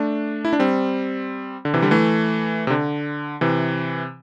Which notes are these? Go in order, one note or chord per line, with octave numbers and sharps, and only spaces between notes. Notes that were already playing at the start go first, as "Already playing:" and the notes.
Already playing: A3 D4
E4
D4
G3 C4
D3
C3 E3
D3 G3
E3 A3
C3
D3
C3 E3